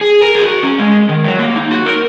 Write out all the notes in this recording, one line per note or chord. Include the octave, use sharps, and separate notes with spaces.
G#4
A#4
G#4
F#4
C#4
G#3
D#3
F#3
A#3
D#4
F#4
A#4